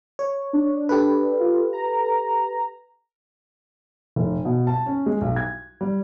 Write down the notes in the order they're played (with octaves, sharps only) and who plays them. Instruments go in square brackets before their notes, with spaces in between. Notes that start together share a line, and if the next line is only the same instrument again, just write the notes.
[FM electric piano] C#5
[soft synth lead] D4
[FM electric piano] G4 A4 B4
[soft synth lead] F4
A#5
[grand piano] F1
B2
A5
C#4
G#3
B1
G#6
G3